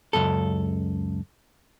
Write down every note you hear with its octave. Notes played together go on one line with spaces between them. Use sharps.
C#2 F#2 A4